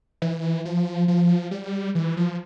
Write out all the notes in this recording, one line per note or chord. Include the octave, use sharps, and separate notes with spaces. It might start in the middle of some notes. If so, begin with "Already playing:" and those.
E3
F3
F3
G3
E3
F3